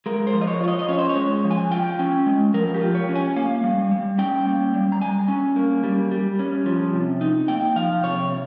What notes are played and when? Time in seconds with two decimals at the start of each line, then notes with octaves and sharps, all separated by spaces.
0.06 G#3 A#4
0.27 C5
0.33 F3
0.41 D#5
0.47 C#5
0.61 F4 C#5
0.68 D#5
0.79 D#5
0.89 C#4 C#5
0.98 C5
1.09 C#5
1.16 G#3
1.44 F3
1.51 G#5
1.71 F4 G5
1.99 C#4
2.26 G#3
2.54 F3 A#4
2.74 G4
2.81 F4
2.95 C#5
3.09 C#4
3.15 G#5
3.36 A#3 F5
3.64 G3
3.91 G3
4.18 C#4 G5
4.46 A#3
4.74 G3
4.92 A#5
5.01 G3 G#5
5.28 C#4
5.56 A#3
5.84 G3
6.11 G3
6.39 C#4
6.66 F3
6.94 C3
7.21 D#4
7.48 A#3 G5
7.76 F3 F5
8.04 C3 C#5